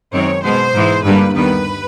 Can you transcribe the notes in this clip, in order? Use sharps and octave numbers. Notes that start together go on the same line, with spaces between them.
F#2 D#3 G#3 C4 C#5
B2 G#3 B3 C5
G#2 E3 G#3
G2 D3 G3 A#3 B4
D#2 D#3 G3 B3 B4